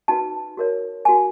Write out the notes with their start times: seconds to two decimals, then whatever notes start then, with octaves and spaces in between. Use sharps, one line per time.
0.08 D#4 F#4 B4 A5
0.57 F#4 A#4 C#5
1.05 D#4 F#4 A#4 G#5